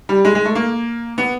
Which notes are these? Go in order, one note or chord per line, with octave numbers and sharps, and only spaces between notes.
G3
G#3
G#3
A3
A#3
B3